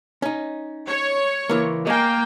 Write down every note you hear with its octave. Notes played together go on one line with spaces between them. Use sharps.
C#4 D#4
C#5
C#2 E3 A#3
A#3 D#5 G5 G#5